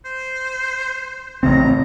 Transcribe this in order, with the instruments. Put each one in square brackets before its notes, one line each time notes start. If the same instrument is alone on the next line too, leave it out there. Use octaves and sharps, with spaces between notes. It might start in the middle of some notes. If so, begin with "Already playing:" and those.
[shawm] C5
[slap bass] A1 C#3 C4 [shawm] A#5